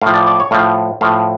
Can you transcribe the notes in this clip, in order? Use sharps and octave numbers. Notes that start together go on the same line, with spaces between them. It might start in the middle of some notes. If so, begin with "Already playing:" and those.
A2 F3 F5
D5
D5
C#5
A2 F3 F5
A2 F3 F5